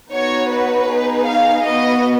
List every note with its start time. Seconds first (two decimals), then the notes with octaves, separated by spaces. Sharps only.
0.12 B3 D#4 F#4 C#5
0.51 B4
0.89 B3 D#4 G#4
1.27 F5
1.65 B3 F#4 D#5